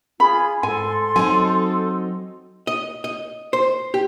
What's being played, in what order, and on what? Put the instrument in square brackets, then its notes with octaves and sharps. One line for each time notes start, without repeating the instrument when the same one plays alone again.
[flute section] F4 G#4 [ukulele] B5
[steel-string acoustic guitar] G#2 [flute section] A4 C6 [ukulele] G#5
[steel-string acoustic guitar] F#3 C4 D#4 [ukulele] G#5
[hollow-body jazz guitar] D#5
D#5
C5
G4